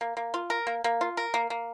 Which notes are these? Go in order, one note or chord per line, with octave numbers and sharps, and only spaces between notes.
A#3
A#3
F4
A#4
A#3
A#3
F4
A#4
A#3
A#3